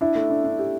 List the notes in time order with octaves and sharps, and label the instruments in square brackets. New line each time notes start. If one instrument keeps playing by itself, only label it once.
[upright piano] D4 [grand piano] E4
[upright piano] A3
D4
D4
G4